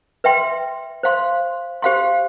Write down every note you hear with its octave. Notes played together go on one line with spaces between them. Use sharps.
B4 E5 G5 C6
C5 F5 C6
G4 C5 F5 C6